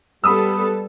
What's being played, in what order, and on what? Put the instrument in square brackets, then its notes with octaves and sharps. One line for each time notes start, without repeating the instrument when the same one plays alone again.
[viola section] G3 B3 A4 [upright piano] B5 D#6 E6